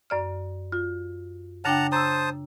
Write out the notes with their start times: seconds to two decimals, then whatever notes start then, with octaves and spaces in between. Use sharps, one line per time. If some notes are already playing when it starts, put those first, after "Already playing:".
0.10 F#2 D5 F6
0.72 F4
1.65 C#3 D4 F#5 G5 A5 A#5
1.92 C5 A5 A#5 D#6 E6